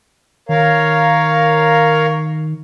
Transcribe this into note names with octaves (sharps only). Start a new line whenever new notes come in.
D#3 A#4 C#5 F5